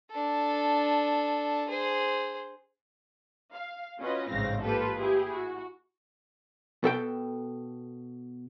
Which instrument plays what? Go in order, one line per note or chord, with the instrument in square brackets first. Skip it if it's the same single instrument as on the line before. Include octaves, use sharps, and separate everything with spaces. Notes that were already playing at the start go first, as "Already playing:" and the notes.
[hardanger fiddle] D4 A4
G#4 C5
[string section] F5
C#4 F4 F#4 B4 D#5
A1 G#2 C#3 C4 F5 A#6
A#3 F4 G4 A4 B4
E4 G4 G#4
F#4
[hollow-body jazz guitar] B2 A4 G5